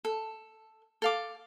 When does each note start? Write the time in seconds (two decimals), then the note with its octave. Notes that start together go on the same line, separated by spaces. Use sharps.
0.05 A4
1.02 A4 F5 D6